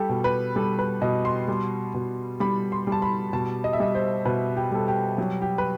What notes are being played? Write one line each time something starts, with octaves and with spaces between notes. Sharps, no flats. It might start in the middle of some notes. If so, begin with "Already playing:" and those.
Already playing: G3 G4 A4
B2
B4
G3 A4
B4
B2 D#5
C6
G3
B2
G3 B5
C6
G3
A5
B5
B2 A5
D#5
E5
G3 D#5
C5
B2 B4
G4
G3 A4
G4
F#3 G4
G4
B4